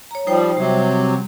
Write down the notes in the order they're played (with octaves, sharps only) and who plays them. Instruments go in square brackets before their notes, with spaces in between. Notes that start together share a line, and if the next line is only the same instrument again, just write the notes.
[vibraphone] C#5 A#5
[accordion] F3 G3 [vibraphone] D#4 C5 G5
[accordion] C3 F#3 [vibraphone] G3